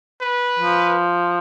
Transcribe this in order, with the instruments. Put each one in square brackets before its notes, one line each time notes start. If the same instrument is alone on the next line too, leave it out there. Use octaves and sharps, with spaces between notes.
[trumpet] B4
[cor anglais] F3